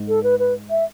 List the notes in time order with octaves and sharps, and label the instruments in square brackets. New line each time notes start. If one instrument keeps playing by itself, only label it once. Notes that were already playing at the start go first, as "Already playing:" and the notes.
Already playing: [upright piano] G#2
[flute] A4
B4
B4
E5